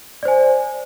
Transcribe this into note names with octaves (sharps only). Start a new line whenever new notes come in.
C5 D5 G#5